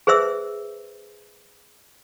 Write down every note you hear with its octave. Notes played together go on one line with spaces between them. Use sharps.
G#4 B4 C5 E5 E6